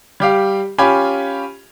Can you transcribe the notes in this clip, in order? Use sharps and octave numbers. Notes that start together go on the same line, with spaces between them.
G3 G4 F5
C#4 F4 G4 G#5 B5